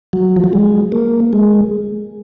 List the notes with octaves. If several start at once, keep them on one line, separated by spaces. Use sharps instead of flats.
F#3
F3
F#3
G#3
A#3
G#3